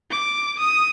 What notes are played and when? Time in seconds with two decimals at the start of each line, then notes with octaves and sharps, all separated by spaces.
0.10 D6
0.59 D#6